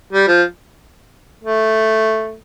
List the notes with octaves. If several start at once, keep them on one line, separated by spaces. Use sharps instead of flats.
G3
F3
A3